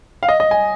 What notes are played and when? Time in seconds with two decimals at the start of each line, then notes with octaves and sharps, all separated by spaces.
0.23 F5
0.29 D#5
0.40 D#5
0.51 G#5